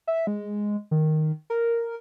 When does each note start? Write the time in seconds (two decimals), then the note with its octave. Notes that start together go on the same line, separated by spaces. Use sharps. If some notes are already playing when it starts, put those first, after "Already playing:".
0.07 E5
0.27 G#3
0.91 D#3
1.50 A#4